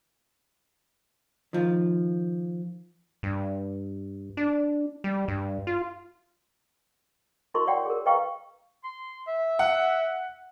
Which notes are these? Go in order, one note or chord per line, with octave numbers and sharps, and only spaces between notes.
D#3 F3
G2
D4
G3
G2
F4
E4 F#4 A#4 D#5 C6 C#6
C#5 D5 F#5 G5
G#4 A#4
B4 D#5 F5 G5 A#5 C#6
C6
E5
F#5